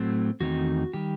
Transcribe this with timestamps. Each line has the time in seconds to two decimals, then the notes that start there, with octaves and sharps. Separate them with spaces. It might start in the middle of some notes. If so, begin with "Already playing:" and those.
Already playing: A2 F#3 A3 C4
0.40 E2 D#3 A3 C4 D#4 F#4
0.93 D#3 G3 G4